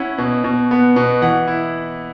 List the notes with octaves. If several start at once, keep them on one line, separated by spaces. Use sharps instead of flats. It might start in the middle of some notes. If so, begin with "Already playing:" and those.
Already playing: C#4 E4 F#5
B2
B2
B3
B2
E3 F#5
E4